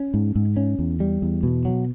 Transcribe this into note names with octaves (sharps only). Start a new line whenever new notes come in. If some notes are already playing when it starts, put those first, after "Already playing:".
Already playing: C#4
G#2
G#2
C#4
E2
G3
E2
B2
F#3